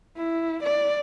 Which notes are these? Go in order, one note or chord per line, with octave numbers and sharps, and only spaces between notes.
E4
D5